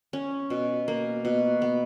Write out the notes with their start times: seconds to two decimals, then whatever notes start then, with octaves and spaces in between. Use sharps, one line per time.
0.13 C#4
0.50 B2
0.88 A#3
1.25 B2
1.62 B3